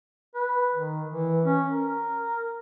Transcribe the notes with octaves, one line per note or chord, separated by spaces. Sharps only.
B4
D#3
E3
C#4
A#4